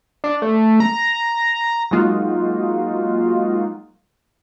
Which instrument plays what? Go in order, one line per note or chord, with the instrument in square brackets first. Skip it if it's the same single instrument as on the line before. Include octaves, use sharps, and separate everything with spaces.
[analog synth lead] D4
A3
A#5
[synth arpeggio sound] F#3 G#3 A#3 D#4 F4 F#4